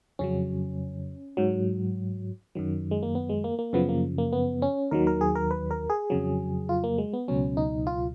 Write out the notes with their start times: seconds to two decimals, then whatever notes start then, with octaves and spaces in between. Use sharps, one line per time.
0.19 F2 C#3 F#3 C#4
1.37 G#2 F#3
2.55 F#2 D#3 F#3
2.91 G#3
3.03 A#3
3.15 B3
3.29 G#3
3.44 A#3
3.59 A#3
3.73 F#2 C#3 F3 B3
3.89 A#3
4.18 A#3
4.33 B3
4.62 C#4
4.91 D#2 D#3 F#3 A#4
5.07 A#4
5.21 G#4
5.35 A#4
5.51 B4
5.71 A#4
5.90 G#4
6.10 F2 C#3 F#3
6.69 F4
6.84 A#3
6.98 G#3
7.13 B3
7.28 C#2 B2 F#3 C#4
7.57 D#4
7.87 F4